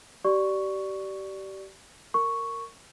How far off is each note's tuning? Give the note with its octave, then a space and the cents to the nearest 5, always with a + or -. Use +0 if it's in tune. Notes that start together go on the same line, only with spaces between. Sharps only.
G4 -30 D5 +0 C#6 +5
A#4 -15 C#6 +0